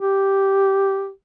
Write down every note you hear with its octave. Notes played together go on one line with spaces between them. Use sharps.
G4